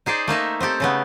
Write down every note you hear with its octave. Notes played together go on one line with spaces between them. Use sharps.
D#4 G#4 C5 D5
A3 A#3 D#4 E5
C4 D#4 G4 A4
C#3 A3 B3